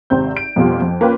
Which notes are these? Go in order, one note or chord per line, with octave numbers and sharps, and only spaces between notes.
G#1 C3 C4 G6
D7
F2 B2 G3 F4
F2
A#3 C#4 F4 B4 G5